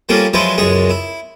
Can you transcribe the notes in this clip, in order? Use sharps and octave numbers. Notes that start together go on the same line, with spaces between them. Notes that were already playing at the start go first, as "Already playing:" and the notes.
F3 G3 A#3 C#4 A4
F3 F#3 G#3 E4 B4 C5
C#2 F#2 G#3 G#4 C#5
E4